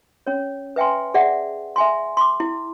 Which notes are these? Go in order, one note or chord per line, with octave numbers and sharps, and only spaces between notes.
C#4 C#5
B4 E5 G5 G#5 C6
G#4 D5 E5 F#5
E5 G#5 C6
C6 D6
E4